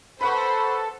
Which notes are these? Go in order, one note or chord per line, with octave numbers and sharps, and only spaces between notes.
A4 B4 C5 F#5 B5 C#6